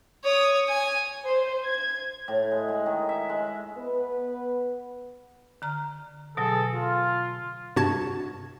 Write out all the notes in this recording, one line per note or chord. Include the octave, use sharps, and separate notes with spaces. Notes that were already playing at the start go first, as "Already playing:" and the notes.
C#5 D#6
G#5
C5
G#6
A2
G#3
G#3
D#3
E5
G#3
B3 B4
D3 A#5 F6
B2 F#3 G#4 A4
F4
G2 C3 F#4 A5 G#6